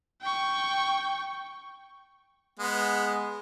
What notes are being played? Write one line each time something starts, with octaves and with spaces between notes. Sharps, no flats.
G5 C#6
G#3 B3